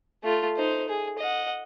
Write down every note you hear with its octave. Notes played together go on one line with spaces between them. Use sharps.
A3 F4
D#4 C5
G#4
D#5 F#5